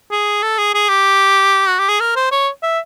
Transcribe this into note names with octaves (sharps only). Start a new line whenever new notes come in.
G#4
A4
G#4
G#4
G4
F#4
G4
G#4
A#4
C5
C#5
E5